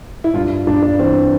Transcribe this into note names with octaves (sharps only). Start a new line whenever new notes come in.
E4
G2 F4
G2 D4
D4
E3 C4